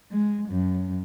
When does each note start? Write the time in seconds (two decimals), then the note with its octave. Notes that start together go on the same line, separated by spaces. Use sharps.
0.12 G#3
0.49 F#2